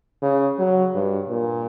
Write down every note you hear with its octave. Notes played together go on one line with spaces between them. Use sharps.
C#3
F#3
G2
A#2